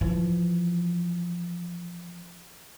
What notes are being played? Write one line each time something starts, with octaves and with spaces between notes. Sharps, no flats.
E3 F3